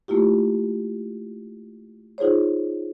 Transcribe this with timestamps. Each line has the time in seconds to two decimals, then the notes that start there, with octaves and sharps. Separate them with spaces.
0.08 A3 A#3 E4 F4 G4
2.18 D#4 F4 G#4 C5 C#5